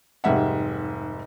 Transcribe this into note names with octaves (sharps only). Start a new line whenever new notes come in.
F1 G#2 G3 E5 F#5